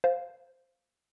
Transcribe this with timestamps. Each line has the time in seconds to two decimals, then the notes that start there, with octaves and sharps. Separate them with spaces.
0.04 C5 F5